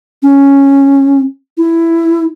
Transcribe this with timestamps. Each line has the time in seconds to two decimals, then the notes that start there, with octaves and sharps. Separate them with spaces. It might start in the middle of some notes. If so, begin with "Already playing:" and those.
0.23 C#4
1.58 E4